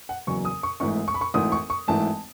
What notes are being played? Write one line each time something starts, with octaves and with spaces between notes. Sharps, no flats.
F#5
F#1 E2 C#3 F#3 C#6
D#6
C#6
G#1 G#2 E3 A3 C#6
C#6
B5
C#6
G#1 G#2 E3 A3 D#6
C#6
C#6
G#1 G#2 E3 A3 A5